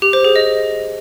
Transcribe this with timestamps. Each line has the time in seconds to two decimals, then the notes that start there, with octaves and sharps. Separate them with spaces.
0.02 G4
0.13 C5
0.24 G#4
0.36 D#5